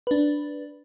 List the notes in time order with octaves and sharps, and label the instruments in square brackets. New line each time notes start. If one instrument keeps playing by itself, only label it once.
[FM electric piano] D4 B4